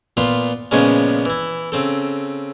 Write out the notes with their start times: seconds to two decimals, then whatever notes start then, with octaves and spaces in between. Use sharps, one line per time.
0.17 A#2 B3 F4 C6
0.71 A#2 C#3 F3 G#3 B3 C#4
1.25 E3 E4
1.72 C#3 C4 A4